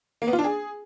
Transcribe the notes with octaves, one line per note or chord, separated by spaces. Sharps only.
A#3
B3
F4
D4
G#4